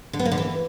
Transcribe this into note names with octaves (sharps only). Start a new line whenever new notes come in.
D3
B3
A#3
D3
E3